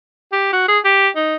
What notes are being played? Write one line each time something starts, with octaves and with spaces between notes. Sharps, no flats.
G4
F#4
G#4
G4
D#4